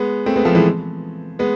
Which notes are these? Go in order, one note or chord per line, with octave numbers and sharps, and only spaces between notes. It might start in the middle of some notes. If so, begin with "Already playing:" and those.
Already playing: G#3 B3
A3 C4
G#3 B3
F3 A3
E3 G#3
G#3 B3